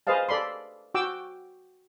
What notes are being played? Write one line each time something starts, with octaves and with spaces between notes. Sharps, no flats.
G#4 B4 C5 D#5 F5 A5
A4 D5 B5 C6
F#4 G5 D6 E6